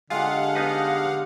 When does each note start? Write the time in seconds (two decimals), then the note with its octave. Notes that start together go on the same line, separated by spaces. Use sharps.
0.10 D3 G#3 F4 G4 F5 F#5
0.55 B3 D#4 B4